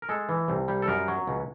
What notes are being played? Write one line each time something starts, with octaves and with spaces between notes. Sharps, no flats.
A#4
G#3 A4
E3
C2
G3
A4
F#2 A#4
F#3
C#2